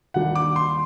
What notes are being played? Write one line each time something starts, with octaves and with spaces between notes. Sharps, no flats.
D#2 D#3 G3 D4 F#5
D6
C6